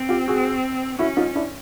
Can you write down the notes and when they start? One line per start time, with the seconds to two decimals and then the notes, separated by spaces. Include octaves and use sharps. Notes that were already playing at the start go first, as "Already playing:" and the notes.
Already playing: C4
0.09 F4 G4
0.28 F#4 G#4
0.99 C#4 E4 F#4
1.17 D#4 F4
1.35 D4 E4